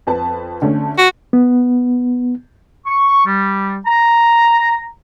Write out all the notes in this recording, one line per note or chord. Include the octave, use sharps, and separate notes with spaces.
F2 B4 A5
D3 A3 C#4
F#4
B3
C#6
G3
A#5